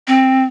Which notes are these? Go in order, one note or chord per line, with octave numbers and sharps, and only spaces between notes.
C4